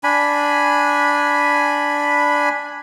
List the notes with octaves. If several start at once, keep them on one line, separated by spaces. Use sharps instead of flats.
D4 G#5 B5